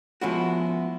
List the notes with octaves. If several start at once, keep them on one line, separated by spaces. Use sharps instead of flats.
F3 G#3 B3 C#4 E4 F#4